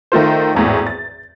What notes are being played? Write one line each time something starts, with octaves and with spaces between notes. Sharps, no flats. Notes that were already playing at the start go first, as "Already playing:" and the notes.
D#3 A3 F4 C5
G#1 E2 A2
A6